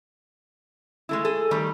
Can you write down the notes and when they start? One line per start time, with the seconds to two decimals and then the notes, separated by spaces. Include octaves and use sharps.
1.09 G#3 A3 E4
1.25 G#4 A4
1.51 D#3 G3 A3